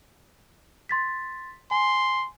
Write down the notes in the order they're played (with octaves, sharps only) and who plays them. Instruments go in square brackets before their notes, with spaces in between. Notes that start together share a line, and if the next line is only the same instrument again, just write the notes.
[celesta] C6 A6 B6
[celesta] G#5 [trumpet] C6